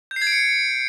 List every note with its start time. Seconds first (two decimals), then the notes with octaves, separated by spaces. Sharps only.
0.11 G6
0.16 C7
0.22 G#6
0.27 D7
0.32 C#7